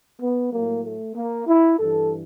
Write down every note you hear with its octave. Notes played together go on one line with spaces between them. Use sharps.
B3
A2 F#3 A#3
A3
A#3
E4
G2 E3 A4